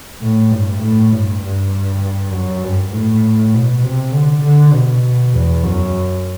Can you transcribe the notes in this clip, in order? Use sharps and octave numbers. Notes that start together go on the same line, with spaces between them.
A2
G2
A2
G2
G2
F#2
G2
A2
B2
C3
D3
D3
B2
E2
F#2